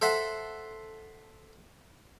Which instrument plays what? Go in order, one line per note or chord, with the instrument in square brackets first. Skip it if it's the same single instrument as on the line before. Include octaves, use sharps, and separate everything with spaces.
[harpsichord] A4 C5 E5 F#5